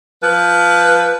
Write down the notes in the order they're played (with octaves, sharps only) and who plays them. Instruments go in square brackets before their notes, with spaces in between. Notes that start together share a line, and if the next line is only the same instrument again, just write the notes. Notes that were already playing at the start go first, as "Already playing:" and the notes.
[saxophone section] F3 B4